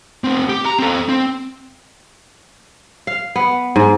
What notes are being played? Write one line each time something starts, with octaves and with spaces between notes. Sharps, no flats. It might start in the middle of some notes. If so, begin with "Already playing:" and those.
A3 C4
G4
A#5
C4 A4
C4
F5
B3
G#2